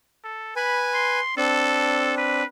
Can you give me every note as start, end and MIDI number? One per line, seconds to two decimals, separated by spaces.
0.24 0.53 69
0.56 1.20 71
0.56 1.20 80
0.56 0.80 83
0.94 1.37 84
1.37 2.42 60
1.37 2.42 62
1.37 2.15 69
2.17 2.45 71